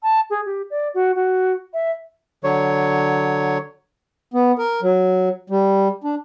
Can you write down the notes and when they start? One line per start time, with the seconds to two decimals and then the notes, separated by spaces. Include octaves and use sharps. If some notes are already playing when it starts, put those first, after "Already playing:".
0.03 A5
0.30 G#4
0.46 G4
0.70 D5
0.94 F#4
1.15 F#4
1.74 E5
2.44 D3 F#3 C#5
4.34 B3
4.58 A#4
4.82 F#3
5.50 G3
6.04 D4